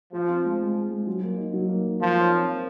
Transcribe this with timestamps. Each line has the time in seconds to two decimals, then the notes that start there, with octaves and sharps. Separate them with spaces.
0.13 F3 F4
0.28 C4
0.45 G#3
0.61 G#3
0.76 G#3
0.91 G#3
1.07 F#3
1.23 A#3
1.37 D#4
1.53 F#3
1.69 A#3
1.85 D#4
2.00 F3 A#4
2.16 C#5
2.31 C4
2.47 A#4